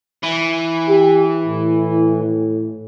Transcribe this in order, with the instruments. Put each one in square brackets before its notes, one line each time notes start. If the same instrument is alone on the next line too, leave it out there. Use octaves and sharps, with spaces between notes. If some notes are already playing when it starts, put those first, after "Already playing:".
[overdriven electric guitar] E3
[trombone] G4
A2